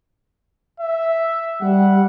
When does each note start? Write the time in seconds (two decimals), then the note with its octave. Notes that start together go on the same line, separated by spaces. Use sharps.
0.80 E5
1.62 G3 F#5